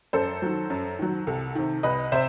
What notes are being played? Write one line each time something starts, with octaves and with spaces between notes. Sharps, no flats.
F#2 A4 C5
D#3 F#3
F#2
D#3 F#3
C2 A4
C3 D#3
C2 B4 D#5
C3 C5 E5